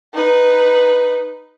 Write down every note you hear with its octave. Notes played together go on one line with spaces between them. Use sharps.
D#4 B4